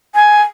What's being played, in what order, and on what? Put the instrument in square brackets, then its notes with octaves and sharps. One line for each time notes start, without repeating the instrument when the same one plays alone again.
[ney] G#5